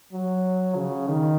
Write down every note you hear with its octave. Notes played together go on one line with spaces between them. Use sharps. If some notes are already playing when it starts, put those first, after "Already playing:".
F#3
C#3
D#3